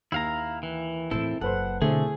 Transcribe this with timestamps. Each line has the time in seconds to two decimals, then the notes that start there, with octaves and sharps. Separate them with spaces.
0.12 D#2 E4 F5 A#5
0.63 E3
1.11 A2 E3 C4 E4 A4
1.41 F#1 A4 B4 C5 F#5
1.81 B2 D3 A3 C4 E4 G#4